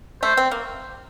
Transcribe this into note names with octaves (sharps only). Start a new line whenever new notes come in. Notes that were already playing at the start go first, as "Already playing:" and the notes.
A3 C5
C4
A#3